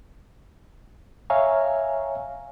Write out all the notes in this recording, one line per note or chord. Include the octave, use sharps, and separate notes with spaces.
C#5 E5 F5 G#5 A#5